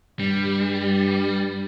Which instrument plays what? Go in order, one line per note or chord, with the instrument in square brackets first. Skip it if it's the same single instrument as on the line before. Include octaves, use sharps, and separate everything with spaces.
[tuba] G2 [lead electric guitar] G3